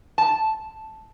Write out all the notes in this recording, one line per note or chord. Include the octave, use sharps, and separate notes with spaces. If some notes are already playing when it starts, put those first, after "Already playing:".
A5